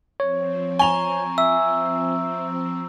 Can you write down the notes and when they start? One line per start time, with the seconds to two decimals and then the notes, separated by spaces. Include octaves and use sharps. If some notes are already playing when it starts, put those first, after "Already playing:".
0.20 F3 C4 C#5
0.79 G#5 A#5 C#6 F7
1.38 E5 E6